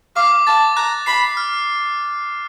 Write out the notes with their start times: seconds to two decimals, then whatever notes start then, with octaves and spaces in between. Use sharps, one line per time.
0.16 F5 D6
0.47 A5 A6
0.77 A#5 F#6
1.06 B5 C7
1.37 F6